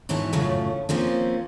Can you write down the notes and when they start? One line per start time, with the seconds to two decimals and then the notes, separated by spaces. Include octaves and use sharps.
0.09 G#2 B2 E3 E4 C#5 A5
0.33 F#2 A2 C#3 F3 A3 C#4
0.89 F3 A#3 C4 C#4